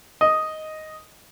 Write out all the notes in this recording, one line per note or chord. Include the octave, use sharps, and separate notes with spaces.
D#5